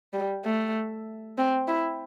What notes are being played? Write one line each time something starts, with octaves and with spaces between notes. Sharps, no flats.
G3
A3
C4
E4